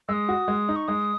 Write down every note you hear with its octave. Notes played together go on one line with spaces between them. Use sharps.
G#3 D#6 E6
F#4
G#3
D#4
C#6
G#3 D#6